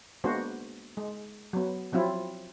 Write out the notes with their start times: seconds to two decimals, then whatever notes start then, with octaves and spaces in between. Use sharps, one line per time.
0.24 G#3 A#3 B3 D4 F#4 C5
0.97 G#3
1.53 F#3 B3
1.92 F3 F#3 C4 E4 F4